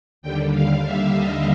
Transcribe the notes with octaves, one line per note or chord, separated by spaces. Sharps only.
D#2 D3 G3 G5
F5
E5
D#5